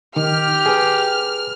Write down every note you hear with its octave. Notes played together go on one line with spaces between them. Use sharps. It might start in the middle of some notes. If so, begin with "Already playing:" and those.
D#3 G4 F6
G#4 B4